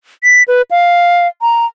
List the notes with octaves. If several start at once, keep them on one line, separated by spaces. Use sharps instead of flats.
B6
B4
F5
A#5